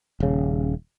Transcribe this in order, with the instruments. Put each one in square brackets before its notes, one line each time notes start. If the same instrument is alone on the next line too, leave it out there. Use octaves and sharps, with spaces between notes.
[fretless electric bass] D#1 C#3